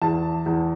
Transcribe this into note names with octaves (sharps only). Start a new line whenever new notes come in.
E2 A5
E2